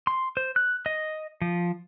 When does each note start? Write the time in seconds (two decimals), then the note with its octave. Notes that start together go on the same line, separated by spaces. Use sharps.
0.07 C6
0.37 C5
0.56 F#6
0.86 D#5
1.42 F3